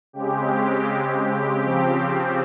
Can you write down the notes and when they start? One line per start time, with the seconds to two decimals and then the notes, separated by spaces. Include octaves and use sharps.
0.13 C#3 G#3 C4 G4
1.24 G4
1.62 C#3 F3 C4